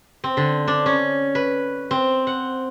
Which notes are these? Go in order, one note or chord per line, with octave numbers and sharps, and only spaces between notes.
C4
D3
D4
C#4
B4
C4
F#5